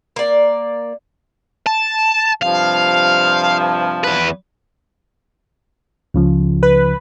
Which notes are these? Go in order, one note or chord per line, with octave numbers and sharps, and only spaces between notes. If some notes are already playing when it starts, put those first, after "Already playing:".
A#3 D5
A5
G2 C3 F3 F5
E2 B4
C#2 C#3 F3
B4